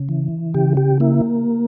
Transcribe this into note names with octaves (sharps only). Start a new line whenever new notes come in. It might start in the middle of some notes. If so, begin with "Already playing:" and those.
Already playing: C#3
E3
C#3 G4
G4
A#3 E4